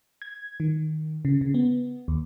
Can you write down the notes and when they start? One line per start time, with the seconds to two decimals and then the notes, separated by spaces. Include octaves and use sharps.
0.22 G#6
0.60 D#3
1.25 C#3
1.41 C#3
1.54 B3
2.08 D#2